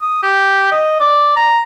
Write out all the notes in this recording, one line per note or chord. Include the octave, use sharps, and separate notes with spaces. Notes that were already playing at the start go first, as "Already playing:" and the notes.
D#6
G4
D#5
D5
A#5